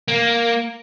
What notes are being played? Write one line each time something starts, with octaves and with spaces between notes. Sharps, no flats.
A#3